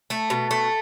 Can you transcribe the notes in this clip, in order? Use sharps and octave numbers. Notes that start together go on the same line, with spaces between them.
A3
B2
A3